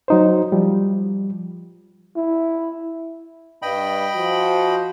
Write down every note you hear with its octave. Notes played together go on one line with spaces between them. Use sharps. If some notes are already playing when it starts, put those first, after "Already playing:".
F#3 D#4 C5
F3 G3
E4
G2 D#5 G5 B5
F3 F#4